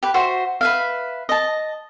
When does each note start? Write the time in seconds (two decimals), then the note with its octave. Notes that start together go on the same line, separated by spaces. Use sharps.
0.03 G4 B4
0.14 F#4 C5 E5
0.61 B4 E5 F5
1.29 D#5 A5